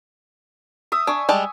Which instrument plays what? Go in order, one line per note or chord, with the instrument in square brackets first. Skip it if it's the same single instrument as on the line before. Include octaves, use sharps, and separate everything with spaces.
[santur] E5 D#6
[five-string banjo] D4 [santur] G#5 C#6
[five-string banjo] G3 G#3 A5